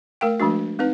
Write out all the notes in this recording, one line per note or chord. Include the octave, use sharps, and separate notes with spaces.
A3 A#4 F5 G5
F3 G#3 A3 D4 F#4
C4 D#4 B4